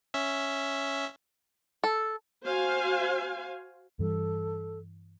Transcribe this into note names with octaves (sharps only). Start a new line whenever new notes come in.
C#4 E5
A4
F#4 C5 F5 G#5
G2 E3 G3 A4